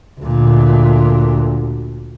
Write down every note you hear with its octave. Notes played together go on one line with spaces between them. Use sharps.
D2 A#2